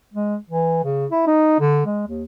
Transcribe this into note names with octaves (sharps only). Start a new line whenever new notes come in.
G#3
E3
C#3
E4
D#4
D3
G#3
D#2